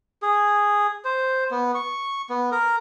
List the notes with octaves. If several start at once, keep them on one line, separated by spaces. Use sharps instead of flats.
G#4
C5
B3
C#6
B3
A#4